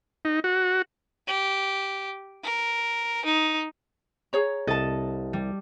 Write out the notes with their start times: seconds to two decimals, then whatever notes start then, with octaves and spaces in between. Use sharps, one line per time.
0.25 D#4
0.44 F#4
1.28 G4
2.44 A#4
3.25 D#4
4.33 G#4 C#5 A#5
4.67 C2 A4 D#5 A5
5.33 G3